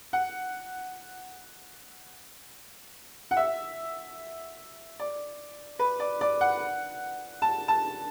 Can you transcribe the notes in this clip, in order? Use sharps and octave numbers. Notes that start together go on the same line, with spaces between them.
F#5
F#5
E5
D5
B4
D5
D5
F#5
A5
A5